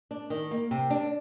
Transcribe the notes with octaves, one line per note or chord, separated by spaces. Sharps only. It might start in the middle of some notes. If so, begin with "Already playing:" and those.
D4
D#3
A#3
C3
D4